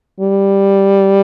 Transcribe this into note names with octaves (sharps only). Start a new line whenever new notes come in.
G3